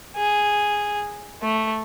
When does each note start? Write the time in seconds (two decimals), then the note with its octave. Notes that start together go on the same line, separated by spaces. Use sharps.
0.16 G#4
1.42 A3